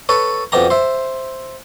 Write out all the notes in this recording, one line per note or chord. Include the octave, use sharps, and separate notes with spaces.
A4 B4 C#5
F2 B2 G4 A#5
C5 E5